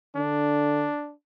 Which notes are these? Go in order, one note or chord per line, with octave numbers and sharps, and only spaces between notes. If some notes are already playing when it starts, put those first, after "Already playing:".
D3 D4